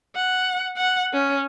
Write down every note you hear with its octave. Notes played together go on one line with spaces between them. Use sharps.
F#5
F#5
C#4